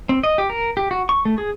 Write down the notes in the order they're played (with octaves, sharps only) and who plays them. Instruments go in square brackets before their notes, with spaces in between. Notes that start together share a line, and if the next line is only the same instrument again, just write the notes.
[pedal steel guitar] C4
D#5
G4
A#4
G4
F#4
C#6
A3
G#4